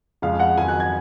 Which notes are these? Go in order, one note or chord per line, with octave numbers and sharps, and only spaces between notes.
F2 C#3 G#3 F5
F#5
F2 D#3 F#3 G#5
F#6
G#6